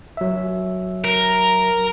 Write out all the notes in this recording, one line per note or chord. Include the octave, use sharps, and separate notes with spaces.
F#3 E5
A#4